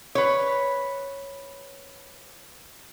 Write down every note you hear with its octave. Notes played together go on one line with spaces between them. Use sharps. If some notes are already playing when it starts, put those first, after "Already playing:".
B4 C#5